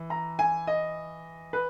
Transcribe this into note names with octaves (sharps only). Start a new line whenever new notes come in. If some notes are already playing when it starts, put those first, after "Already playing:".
Already playing: E3
A#5
G#5
D#5
B4